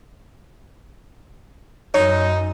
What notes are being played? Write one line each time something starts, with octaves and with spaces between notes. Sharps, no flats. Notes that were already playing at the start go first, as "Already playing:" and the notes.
F#2 D#4 C#5